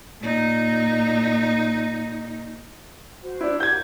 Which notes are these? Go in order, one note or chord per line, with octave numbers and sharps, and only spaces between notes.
A#2 D#4
F#4 C5
D4 E4
G4 A#4 G6 G#6